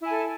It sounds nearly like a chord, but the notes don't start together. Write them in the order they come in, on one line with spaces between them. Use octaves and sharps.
E4 G#5 A4